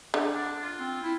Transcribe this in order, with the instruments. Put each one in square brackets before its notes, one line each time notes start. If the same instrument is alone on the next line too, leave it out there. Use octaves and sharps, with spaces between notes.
[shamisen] D3
[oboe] D4
F4
[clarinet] C4
E4